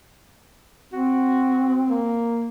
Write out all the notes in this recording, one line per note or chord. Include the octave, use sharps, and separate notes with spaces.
C4 F#4
A#3